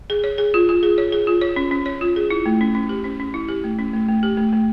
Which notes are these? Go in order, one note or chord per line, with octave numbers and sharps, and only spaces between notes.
G#4
C#5
G#4
F4
F4
G#4
C#5
G#4
F4
C#5
C#4
C#4
C#5
F4
G#4
E4
A3
C#4
C#4
G4
C#4
C#4
E4
G4
A3
C#4
A3
A3
G4
A3
A3